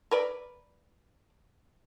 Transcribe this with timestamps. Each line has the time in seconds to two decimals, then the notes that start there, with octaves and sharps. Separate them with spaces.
0.11 A#4 B4 D5